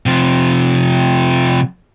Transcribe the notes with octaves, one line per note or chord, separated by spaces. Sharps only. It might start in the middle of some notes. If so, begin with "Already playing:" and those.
C3 F3